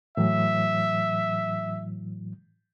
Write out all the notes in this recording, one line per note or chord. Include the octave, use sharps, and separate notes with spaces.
A2 E3 F#3 E5